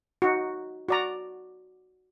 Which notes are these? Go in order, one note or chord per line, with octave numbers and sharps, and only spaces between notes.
D#4 F#4
F#4 D5 A#5